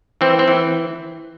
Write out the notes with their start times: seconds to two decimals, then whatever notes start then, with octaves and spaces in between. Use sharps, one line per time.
0.21 E3 C4
0.39 C4
0.48 E3